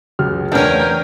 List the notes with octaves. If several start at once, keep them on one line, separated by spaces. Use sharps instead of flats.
C#2 F#3 F6
E2 C#4 D4 A#4 G5